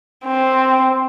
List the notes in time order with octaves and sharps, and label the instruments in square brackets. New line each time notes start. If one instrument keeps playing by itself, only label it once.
[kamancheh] C4